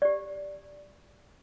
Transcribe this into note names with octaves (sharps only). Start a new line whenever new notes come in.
G4 D5